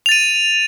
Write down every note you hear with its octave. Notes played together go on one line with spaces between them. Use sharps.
A6 D#7 F7